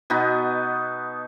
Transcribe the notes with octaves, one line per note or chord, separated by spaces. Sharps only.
B2 B3 D#4 F#4